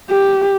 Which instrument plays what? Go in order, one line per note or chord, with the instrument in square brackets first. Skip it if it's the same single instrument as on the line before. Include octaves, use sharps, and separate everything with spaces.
[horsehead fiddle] G4